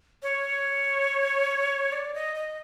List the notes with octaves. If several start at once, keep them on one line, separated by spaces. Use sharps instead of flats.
C#5
D5
D#5
D#5